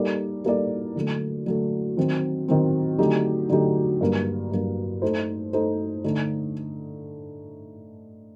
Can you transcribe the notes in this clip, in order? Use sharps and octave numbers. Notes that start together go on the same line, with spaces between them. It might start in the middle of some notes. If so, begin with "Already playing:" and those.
Already playing: G3 A#3 D#4 A4 D5
G3 A#3 D#4 A4 D5
D3 F#3 A3
D3 F#3 A3
D#3 F#3 C4
D#3 F#3 C4
D3 F#3 A3 D#4 G4
D3 F#3 A3 D#4 G4
G2 F#3 A#3
G2 F#3 A#3
A3 D#4 A4 C5
A3 D#4 A4 C5
D3 A3 D#4